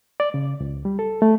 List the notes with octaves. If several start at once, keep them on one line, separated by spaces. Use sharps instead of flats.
D5
C#3
C#2
G3
A4
A3